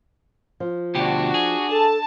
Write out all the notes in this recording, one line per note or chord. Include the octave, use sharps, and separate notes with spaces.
F3
D2 B2 D4 F#4 G4
G#4
A4 A5